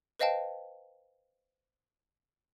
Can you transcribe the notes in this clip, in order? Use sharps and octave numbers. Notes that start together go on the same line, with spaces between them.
B4 C5 D#5 F5 G5 A5